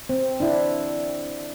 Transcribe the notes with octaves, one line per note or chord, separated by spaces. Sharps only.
C4
D4 E4